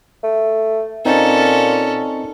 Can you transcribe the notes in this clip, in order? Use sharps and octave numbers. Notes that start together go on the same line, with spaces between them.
A3
A#2 C4 C#4 D#4 A4